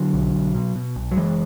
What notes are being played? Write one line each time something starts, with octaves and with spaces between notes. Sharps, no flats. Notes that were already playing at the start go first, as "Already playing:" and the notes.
Already playing: D3 F#3
B1
B1
B2
B2
B1
F#3
F#1 E3 G#3